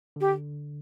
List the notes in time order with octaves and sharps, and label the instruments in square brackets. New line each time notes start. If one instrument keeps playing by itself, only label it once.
[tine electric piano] D3 [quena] G4